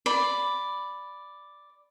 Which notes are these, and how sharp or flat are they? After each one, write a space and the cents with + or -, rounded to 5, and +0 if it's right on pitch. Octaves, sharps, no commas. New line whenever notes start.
D5 +0 B5 +0